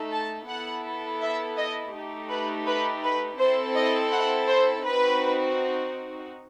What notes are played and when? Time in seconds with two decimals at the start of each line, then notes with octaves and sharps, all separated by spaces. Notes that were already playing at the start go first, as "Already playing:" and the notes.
Already playing: A3 D#4 A4
0.13 A5
0.48 B3 E4 A4 F#5
1.21 E5
1.58 D#5
1.94 A3 D#4 G4
2.31 B4
2.67 B4
3.03 B4
3.39 C4 E4 A4 C5
3.76 D#5
4.12 F#5
4.48 C5
4.85 C4 D#4 F#4 B4